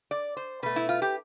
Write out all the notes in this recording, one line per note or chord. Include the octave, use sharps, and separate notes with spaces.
D5
C5
B2 A3 B4
E4
F4
G4